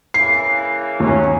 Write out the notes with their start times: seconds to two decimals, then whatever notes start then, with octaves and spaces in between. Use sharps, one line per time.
0.14 C#3 E3 A#3 C7
1.00 D#2 F#3 C#4